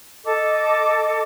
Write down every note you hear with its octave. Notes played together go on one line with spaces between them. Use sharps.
A4 D#5 D6